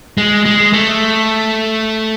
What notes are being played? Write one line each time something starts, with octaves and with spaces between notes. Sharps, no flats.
G#3
G#3
A3